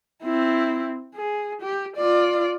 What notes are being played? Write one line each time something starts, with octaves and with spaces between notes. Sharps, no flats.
C4 E4
G#4
G4
F4 D5